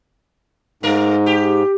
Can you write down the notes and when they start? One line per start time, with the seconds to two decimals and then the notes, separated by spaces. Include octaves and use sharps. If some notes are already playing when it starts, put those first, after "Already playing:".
0.83 G#2 A3 A#4
1.26 G4